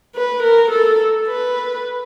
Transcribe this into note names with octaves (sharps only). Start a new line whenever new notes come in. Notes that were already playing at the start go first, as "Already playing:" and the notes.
B4
A#4
A4
B4